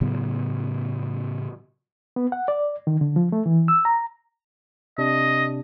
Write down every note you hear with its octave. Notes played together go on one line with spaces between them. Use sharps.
A2 C#3 F#3 B3
B3
F#5
D5
D#3
D3
F3
A3
E3
E6
A#5
C3 D4 D#5